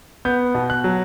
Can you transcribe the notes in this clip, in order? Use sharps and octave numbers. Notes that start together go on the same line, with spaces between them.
B3 G6
B2
F#6
F#3